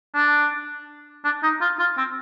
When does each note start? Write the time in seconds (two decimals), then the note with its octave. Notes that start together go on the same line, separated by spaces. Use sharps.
0.15 D4
1.24 D4
1.43 D#4
1.61 F4
1.79 F4
1.97 C4